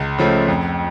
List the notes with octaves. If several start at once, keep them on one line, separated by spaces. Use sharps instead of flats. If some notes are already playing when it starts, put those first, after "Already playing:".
Already playing: C#2
C#3 F3 A3
F2